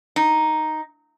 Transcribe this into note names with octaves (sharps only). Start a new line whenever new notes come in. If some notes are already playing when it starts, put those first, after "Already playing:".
D#4